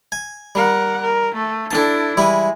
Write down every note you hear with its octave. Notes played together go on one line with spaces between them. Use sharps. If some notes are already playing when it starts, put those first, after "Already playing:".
G#5
G3 A#4 F#5
A#4
A3
D4 E4 A4 A5
E3 G3 G#3 E4